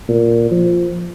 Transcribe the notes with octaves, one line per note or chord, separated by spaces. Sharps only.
A#2
F3